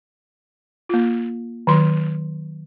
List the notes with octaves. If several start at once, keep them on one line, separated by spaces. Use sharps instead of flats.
A#3 F4
D#3 F#3 C6